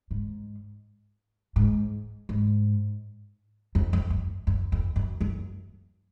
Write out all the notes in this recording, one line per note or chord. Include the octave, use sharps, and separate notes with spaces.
G#2
G#2
G#2
F2
F2
F#2
F#2
F2
F#2
F#2